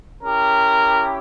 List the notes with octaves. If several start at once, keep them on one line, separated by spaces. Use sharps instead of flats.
C#4 E4 G4 A#4